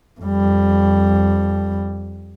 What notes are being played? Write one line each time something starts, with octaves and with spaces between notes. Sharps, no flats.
F2 G3